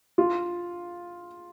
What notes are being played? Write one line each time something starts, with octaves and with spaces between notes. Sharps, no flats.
F4